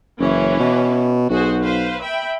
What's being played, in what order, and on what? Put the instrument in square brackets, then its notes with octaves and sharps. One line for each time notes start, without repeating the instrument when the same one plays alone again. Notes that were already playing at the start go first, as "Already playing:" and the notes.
[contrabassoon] F#1 [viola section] E3 C#4
[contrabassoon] B2
[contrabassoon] B1 [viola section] F#4 G#4 C5
[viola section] B4 C5 F5
E5 G5 B5